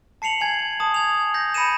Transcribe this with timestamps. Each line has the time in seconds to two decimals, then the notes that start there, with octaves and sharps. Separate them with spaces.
0.22 A5 C7 C#7 F7 F#7
0.41 G#5 G#6
0.80 A5 D#6
0.94 G#6 F7
1.34 G6 A#6
1.54 B5 A#6 C#7 D#7 E7